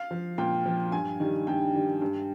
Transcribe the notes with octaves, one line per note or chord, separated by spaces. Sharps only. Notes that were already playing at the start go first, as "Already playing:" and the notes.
Already playing: F5
F3
A#2 G5
F3
G2 G#5
D#3 G3
G2 G5
D#3 G3
G2